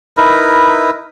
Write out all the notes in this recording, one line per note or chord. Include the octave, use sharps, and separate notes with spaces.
D#4 E4 A#4 B4